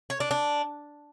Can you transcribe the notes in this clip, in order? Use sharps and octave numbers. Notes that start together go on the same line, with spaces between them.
C#5
D4
D4